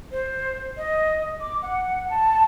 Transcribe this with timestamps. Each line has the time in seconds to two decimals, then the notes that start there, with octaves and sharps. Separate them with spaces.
0.12 C5
0.77 D#5
1.41 D6
1.62 F#5
2.10 A5